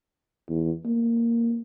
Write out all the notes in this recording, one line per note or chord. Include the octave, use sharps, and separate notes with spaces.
E2
A#3